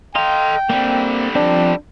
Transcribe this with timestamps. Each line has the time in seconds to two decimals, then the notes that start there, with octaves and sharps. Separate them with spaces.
0.15 A4 D#5 F5 G5 A#5 C6
0.70 D3 G3 A#3 C4
1.35 F3 C4 D4